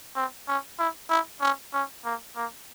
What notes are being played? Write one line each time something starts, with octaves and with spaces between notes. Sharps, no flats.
C4
C#4
E4
E4
C#4
C#4
A#3
A#3